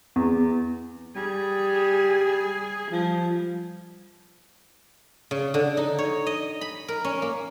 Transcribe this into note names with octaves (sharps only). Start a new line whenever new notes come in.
E2
G3 G#4
F3 G3
C#3
D3
D#4
C#5
D#5
B5
A#4
C#4
A#3